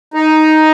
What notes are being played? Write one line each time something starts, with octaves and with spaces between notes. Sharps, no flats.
D#4